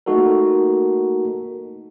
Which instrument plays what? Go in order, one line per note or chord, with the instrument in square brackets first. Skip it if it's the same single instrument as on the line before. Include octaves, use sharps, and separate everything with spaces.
[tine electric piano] A3 A#3 D#4 F#4 A4 A#4